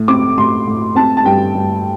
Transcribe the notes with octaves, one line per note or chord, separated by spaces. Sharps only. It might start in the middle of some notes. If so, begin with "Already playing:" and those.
Already playing: A2
C4 D6
A2 C6
A2
C4 A5
A5
G2 G5
G2